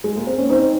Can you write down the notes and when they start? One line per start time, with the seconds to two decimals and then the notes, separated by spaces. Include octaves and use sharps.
0.04 G#3
0.16 A#3
0.27 C4
0.38 C#4
0.50 C4 D#4